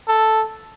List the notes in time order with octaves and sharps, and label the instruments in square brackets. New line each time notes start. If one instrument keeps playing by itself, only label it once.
[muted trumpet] A4